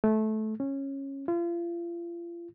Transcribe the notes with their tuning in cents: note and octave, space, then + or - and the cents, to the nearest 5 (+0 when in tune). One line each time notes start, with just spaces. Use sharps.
A3 -20
C#4 -15
F4 -35